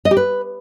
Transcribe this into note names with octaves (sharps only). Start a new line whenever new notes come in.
D#5
G4
B4